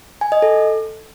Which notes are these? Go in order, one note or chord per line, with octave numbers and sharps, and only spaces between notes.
G#5
D#5
A4